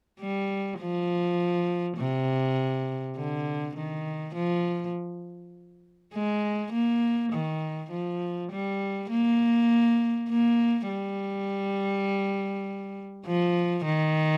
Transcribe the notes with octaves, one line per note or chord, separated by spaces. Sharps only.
G3
F3
C3
D3
D#3
F3
G#3
A#3
D#3
F3
G3
A#3
A#3
G3
F3
D#3